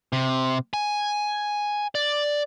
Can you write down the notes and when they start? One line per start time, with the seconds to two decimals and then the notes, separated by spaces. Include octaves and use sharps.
0.13 C3
0.74 G#5
1.95 D5